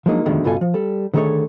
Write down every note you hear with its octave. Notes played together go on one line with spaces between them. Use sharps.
F3 F#3 G#3 A#3 D4 D#4
F2 B2 D3 D#3 G#3 A3
C#2 G2 B2 F4 A4 G#5
F3
G3 A4
D3 D#3 A3 G#4 A4 C#5